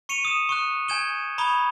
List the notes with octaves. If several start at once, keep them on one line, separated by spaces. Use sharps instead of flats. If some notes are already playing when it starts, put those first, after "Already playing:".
C#6 C#7 D#7 F7
D#6 E7
C#6 D#6 F#6
G#5 G6 G#6 E7 G7
A#5 B5 C#6 D#6 G#6 G7